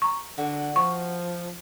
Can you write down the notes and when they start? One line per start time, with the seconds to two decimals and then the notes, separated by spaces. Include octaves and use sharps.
0.02 A#5 C#6
0.38 D3 F#4
0.76 F3 C#6